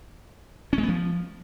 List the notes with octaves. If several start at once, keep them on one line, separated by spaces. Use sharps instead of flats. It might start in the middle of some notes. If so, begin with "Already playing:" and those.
C#4
G#3
B3
F3